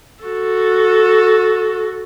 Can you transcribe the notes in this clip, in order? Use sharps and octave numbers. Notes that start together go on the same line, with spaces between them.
F#4 A4